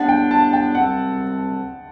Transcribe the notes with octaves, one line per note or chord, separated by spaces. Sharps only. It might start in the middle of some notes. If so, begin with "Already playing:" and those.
Already playing: A2 G3 B3 D4 F#5
G5
A5
G5
C2 C3 G3 C4 F#5